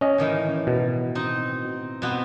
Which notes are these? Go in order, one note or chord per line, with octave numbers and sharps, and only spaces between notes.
C#4 D#5
A2 D#3 E3
B2
C4 D#4
B2 B3 C4